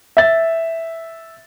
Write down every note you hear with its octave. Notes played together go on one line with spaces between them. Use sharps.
E5 A6